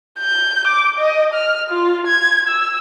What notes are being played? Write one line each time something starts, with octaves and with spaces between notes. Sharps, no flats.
G6
D6
D#5
F6
F4
G#6
E6